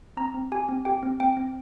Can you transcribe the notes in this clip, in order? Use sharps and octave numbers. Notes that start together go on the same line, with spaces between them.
C4 A#5
C4
G4 G#5
C4
G4 G5
C4
C4 G5
C4